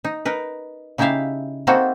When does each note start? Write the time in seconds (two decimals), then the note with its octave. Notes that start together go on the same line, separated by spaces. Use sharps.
0.04 D#4
0.25 D#4 A#4 B4
0.98 C#3 D#4 E4 G4 E5 F5
1.67 A#3 C4 D#4 E4 F#4 A4